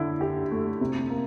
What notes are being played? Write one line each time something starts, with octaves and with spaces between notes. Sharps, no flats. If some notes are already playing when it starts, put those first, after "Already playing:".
Already playing: D3 E4
G4
A3
C3
A#3